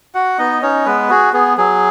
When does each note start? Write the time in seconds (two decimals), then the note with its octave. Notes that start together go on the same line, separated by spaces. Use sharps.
0.15 F#4 F#5
0.38 B3 D#4 D#5
0.62 C#4 D#4 C#5
0.86 G#3 B3 B4
1.10 F#4 G#4
1.33 B3 G#4
1.58 F#3 G#4